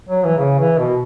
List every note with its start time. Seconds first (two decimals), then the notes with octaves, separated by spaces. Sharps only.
0.09 F#3
0.24 E3
0.38 C#3
0.59 E3
0.78 B2